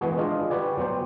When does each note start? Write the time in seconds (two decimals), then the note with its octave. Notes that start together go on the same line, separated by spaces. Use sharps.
0.01 E3 G#3 B3 F#4 G#4
0.17 G#3 D4 F4 D#5
0.50 F#4 G4 B4 D5 G#5
0.78 F#3 B3 C5 G5